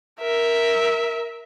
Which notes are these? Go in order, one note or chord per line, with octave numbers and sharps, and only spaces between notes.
A#4 E5